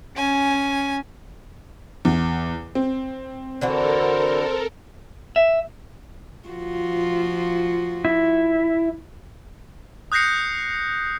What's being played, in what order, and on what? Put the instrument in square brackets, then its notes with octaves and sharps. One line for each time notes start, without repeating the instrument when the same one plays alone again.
[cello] C#4 [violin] G#5
[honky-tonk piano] E2
C4
[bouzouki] D3 E3 F#4 [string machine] A4 A#4 [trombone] C5
[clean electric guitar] E5
[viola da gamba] F3 F4 F#4
[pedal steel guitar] E4
[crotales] D#6 F#6 G6 A#6 C7 C#7